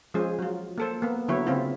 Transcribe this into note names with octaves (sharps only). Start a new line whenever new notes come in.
F3 G#3 C#4 G#4 C5
F#3 F4
A#3 A4 C5
A#3 B3
D3 F#3 B3 E4 C#5
C#3 C4 E4 F4